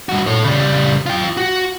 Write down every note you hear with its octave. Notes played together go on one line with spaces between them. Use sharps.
G2 F#4
A4 C#5
C#3 G3
F4 G5
F#4